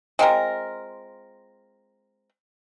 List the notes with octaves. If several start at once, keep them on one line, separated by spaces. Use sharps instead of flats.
G#3 C4 F4 A#4